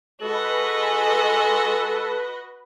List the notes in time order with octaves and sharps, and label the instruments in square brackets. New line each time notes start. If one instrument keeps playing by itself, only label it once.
[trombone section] G#3 [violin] F#4 D#5 [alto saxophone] A4 [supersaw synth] B4